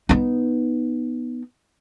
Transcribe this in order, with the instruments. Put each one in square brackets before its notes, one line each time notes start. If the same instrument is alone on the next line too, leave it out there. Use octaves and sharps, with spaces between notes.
[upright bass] B3 D#4